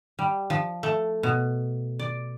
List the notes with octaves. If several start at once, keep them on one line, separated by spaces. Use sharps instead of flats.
G3
F3
A3
B2
D5